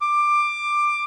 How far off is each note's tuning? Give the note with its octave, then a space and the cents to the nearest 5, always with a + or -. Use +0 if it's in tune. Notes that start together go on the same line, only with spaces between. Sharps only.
D6 +15